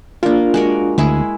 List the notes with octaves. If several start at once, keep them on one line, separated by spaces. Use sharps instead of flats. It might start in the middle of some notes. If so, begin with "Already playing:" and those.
A#3 D4 F4 A#4
G#3 F#4 A#4
D2 G#3 E4 G#4